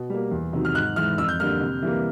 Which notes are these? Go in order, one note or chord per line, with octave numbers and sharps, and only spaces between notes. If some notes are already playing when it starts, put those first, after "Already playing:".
Already playing: B2
G3 A#3
E2
C3 D#3 F#3
F6
G#2 F#6
E3 G#3 F6
F2 E6
G6
D3 G3 A#3 F6
C3
E3 G3 A#3